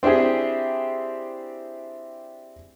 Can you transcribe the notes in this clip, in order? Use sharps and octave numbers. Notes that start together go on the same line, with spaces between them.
C4 D4 E4 G4 G#4